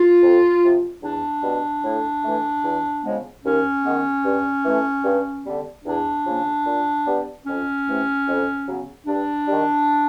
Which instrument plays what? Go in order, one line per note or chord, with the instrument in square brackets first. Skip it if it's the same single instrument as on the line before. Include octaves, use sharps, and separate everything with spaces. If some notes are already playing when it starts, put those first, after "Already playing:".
Already playing: [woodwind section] F4
F2
C3 F3
E2 D4
B2 G3 B3
A2
E3 A3
E2
C#3 F3 G#3 B3
D#2 C#4
D#3 G#3 B3
G2
E3 A3
G2
D3 G3 B3
E2 D4
C#3 F3 A#3
A#2
G3 B3
F2 C#4
C3 E3 A3
F2
C#3 F#3 B3
G2 D4
D#3 G3